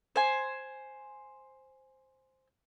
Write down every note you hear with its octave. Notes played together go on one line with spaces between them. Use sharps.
C5 G#5